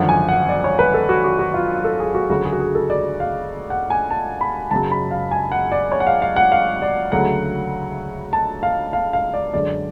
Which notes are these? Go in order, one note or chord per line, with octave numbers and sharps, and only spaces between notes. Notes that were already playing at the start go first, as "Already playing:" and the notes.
Already playing: G#1 F#2 D3 F3 F#5
G#5
F#5
D5
C#5
B4
A4
F#4
F#4
F#4
F4
A4
G#4
F#4
D2 C#3 F#3 A3 F#4
G#4
F#4
G#4
A4
D5
F5
F#5
G#5
A5
B5
F#1 F#2 C#3 F#3 A5
B5
F5
G#5
F#5
D5
C#5
F#5
F5
F5
F#5
F5
D5
D2 C#3 F#3 A3 F#5
A5
F5
F5
F5
D5
F#2 D3 G#3 D5